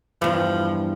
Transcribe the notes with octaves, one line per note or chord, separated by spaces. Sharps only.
E2 G2 F3